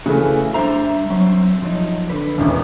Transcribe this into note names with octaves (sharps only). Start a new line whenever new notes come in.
C#3 E3 A3 F#4
G3 D4 C5 E5 A#5
F#3 C4 C#4
F3 F#3 D#4
D3 B4
E1 A1